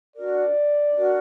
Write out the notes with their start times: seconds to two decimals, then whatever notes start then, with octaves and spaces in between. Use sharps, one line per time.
0.16 D4 F#4 A#4 D5
0.94 D4 F#4 A#4